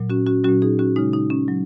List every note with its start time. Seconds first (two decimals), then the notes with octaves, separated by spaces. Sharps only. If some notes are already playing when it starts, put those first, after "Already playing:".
Already playing: A#2 F#3
0.10 C#4 F#4
0.26 C#4 F#4
0.44 A#2 F#3 C#4 F#4
0.62 D#4 G#4
0.79 C#4 F#4
0.96 C#3 G#3 D#4
1.13 D#4
1.30 C#4
1.48 F#3